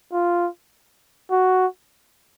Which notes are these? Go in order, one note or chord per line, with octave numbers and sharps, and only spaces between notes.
F4
F#4